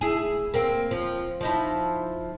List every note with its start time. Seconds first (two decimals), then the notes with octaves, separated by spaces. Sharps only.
0.01 E4 G#4
0.54 A#3 C4
0.91 F3
1.41 F3 D#4 E4